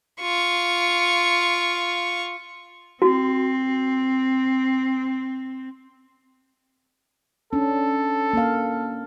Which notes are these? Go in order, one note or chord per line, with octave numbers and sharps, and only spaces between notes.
F4 C#6
C4 F#4
C#4 D4 A4
A#3 F5